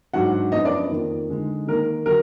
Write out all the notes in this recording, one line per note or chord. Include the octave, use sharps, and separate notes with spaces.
G#2 F#3 D4 F#4 F#5
F#2 F3 B3 D#4 D#5
D4 D5
F2 D#3 A#3
D3 G#3 D#4
D#3 A#3 D#4 A#4
D3 F#3 A#4